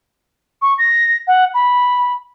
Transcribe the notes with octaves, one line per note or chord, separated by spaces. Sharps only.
C#6
A#6
F#5
B5